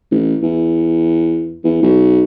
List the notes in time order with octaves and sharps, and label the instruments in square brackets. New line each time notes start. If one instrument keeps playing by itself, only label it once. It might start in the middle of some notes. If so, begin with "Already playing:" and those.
[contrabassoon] A1
E2
E2
B1